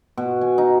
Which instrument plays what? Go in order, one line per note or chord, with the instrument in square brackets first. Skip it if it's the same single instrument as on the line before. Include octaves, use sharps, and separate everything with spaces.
[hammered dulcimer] B2
G#5
D#4